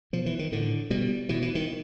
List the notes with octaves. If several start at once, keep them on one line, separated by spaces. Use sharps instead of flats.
B2 F3
E3
D#3
A2 D3
B2 G3
B2 E3
E3
D#3